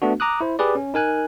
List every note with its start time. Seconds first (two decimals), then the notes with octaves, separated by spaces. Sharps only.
0.02 A3 B3 D4 F#4
0.20 A#5 D6 D#6 F#6
0.41 E4 C5
0.59 G4 G#4 B4 D5
0.75 C#4
0.94 D#4 A#4 G#5 F#6